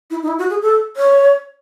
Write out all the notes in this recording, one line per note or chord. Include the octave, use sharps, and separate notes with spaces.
E4
D#4
E4
F#4
G#4
A4
C#5